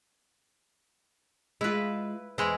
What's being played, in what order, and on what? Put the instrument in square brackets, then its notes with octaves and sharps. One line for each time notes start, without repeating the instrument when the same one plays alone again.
[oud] G#3 F4 [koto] E4 B4
[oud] E2 C4 [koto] G#3 E4